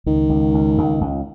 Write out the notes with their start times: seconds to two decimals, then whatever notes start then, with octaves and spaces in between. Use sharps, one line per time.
0.06 C#2 D#3
0.30 C#2
0.54 C#2
0.78 C#2
1.01 C#2